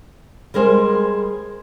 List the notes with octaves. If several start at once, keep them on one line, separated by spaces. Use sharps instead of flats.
G3 G#3 A#4 C5 G#5